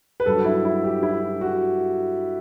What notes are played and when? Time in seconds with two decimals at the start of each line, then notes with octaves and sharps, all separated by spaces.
0.20 B4
0.26 G2 F#3 A4
0.36 F#4
0.45 E4
0.65 E4
0.84 G4
1.03 E4
1.41 F#4